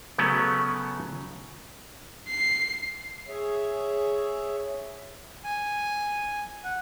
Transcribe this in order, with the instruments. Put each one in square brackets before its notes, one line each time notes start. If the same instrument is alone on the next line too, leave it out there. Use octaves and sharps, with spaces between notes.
[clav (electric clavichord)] C#3 F#3 A3 B3 C#4
[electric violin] C7
[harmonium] G#4 C#5 E5
[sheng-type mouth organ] G#5
F#5